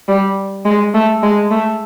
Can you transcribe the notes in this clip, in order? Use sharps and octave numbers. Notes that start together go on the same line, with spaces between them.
G3
G#3
A3
G#3
A3